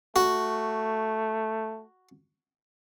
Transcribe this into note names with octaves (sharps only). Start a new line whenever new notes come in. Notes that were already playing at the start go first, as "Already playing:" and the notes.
A3 F#4